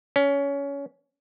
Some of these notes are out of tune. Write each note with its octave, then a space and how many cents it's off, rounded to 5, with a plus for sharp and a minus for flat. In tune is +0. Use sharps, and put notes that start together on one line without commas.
C#4 +20